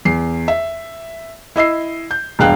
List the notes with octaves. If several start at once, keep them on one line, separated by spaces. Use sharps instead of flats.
E2 C7
E5
E4 D#5 E6 C7
G6
E1 G2 G#3 F5 G5 F#6